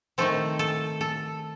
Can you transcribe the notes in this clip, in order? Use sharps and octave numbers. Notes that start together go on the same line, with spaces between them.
D#3 A3 C4 A4
A4
A4